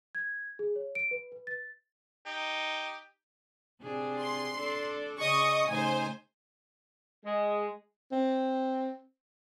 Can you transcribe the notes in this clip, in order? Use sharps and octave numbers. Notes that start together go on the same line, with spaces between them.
G#6
G#4
C#5
D7
B4
B4
A6
D#4 G4
C3 D4 G#4
C6
D4 A4 D5
C#3 G#4 D#5 C#6 D#6
C#3 A3 D#4 C5 G#5
G#3
C4